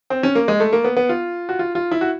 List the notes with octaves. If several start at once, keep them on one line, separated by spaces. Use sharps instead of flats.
C4
C#4
A#3
G#3
A3
A#3
B3
B3
F4
F#4
F4
F4
E4
F#4